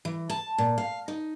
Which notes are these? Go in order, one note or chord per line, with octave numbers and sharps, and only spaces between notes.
E3
A5
A#2
F5
D#4